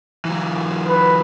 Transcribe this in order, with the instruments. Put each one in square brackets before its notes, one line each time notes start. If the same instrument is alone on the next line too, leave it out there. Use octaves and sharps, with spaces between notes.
[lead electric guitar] E3 F#3
[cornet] B4